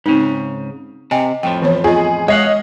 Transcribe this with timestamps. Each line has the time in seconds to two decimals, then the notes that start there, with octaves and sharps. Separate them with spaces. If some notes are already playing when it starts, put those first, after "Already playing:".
0.06 G#2 C#3 C4 D#4
1.11 C3 D#5 G5 G#5
1.43 F2 A2 F3 G5
1.62 E3 B3 C#5
1.84 F4 G#4 D#5
2.28 G#3 C#5 D#5 F5 F#5